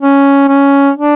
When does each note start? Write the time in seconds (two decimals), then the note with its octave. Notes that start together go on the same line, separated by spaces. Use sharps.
0.02 C#4
0.48 C#4
0.95 D4